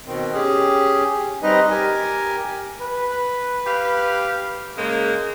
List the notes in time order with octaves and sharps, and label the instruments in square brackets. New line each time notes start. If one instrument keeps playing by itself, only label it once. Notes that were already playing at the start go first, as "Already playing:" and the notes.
[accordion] B2 D#3 C4
C#4 G4 G#4
G3 C4 D#4 B4 D#5
G4 A#4 G#5
[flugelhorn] B4
[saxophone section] G4 F5
C#3 G#3 A#3